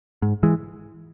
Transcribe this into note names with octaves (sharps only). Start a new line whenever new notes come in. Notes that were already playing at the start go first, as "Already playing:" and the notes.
G#2
E3 G#3